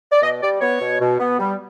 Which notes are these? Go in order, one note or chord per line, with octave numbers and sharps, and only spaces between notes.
D5
B2 D#5
G3 D5
B3 C#5
B2
B2
B3
G3